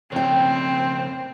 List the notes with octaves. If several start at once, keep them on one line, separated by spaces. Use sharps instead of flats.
F2 C#3 C4 C#5 G5